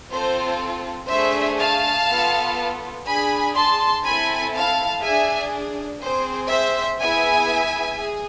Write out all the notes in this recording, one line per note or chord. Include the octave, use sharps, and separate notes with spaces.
C4 F4 A4 C5
A3 D4 G#4 C5 E5
F5 A5
B3 F4 A4
D4 G#4 G#5 B5
A5 C6
C4 E4 A4 G#5 B5
F5 A5
D4 G#4 E5 G#5
C4 G#4 C5
C5 E5
B3 E4 G#4 E5 G#5
G#4